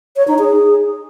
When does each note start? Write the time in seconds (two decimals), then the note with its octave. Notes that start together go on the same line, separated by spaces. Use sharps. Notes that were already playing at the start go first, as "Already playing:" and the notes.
0.17 C#5
0.28 D#4
0.39 G#4